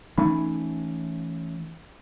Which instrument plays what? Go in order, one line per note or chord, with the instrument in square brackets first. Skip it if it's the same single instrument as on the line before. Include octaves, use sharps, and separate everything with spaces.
[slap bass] E3 A3 C#4 [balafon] D#4